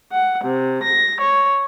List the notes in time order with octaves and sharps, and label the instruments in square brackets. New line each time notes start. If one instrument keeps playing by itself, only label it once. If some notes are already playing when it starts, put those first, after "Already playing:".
[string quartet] F#5
C3
A#6
C#5